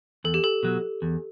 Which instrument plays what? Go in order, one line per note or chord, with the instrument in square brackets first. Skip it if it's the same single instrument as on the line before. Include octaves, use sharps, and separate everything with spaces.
[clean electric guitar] E2 [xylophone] A4
[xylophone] G4
A4
[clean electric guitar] B2 F#3
E2